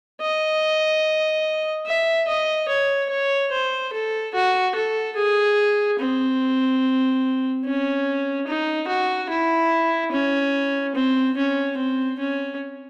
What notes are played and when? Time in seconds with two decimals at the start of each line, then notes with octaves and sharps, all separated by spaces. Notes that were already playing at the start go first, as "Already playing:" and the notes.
0.21 D#5
1.86 E5
2.28 D#5
2.69 C#5
3.10 C#5
3.52 C5
3.93 A4
4.34 F#4
4.75 A4
5.16 G#4
5.99 C4
7.65 C#4
8.47 D#4
8.88 F#4
9.29 E4
10.12 C#4
10.95 C4
11.37 C#4
11.77 C4
12.19 C#4